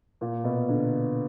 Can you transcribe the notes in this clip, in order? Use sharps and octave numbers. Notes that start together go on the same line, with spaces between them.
A#2
B2
D3